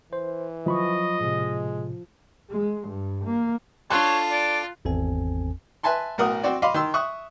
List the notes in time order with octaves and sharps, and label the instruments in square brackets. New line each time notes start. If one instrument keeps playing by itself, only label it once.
[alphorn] E3 [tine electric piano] C5
[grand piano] F3 [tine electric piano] F#3 B5 C#6 [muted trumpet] D#5
[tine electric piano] A2 C3 [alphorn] G#3
[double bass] G#3
G2
A#3
[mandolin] D4 A4 [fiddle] F4 [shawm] C#5 [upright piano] A5 C6 F#6
[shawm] D5
[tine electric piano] G#1 E2 C4 A4 G#5
[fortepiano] B4 E5 G#5 A5 C6
B1 A2 A#4 F#5 D#6
C4 F#4 D5
D#5 F5 B5 C6 D6
D#3 C6 E6
E5 C#6 D#6 F#6